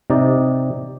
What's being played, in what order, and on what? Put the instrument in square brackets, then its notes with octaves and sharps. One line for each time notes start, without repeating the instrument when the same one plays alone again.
[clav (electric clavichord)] C3 D#4 D5